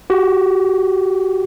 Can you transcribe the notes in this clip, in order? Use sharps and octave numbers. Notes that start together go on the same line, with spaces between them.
F#4 G4